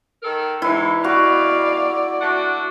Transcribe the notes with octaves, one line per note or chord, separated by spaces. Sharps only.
D#3 A4 A#4
G#2 B2 E3 E4
B2 F#4 D5 F5
A3 D4 F#4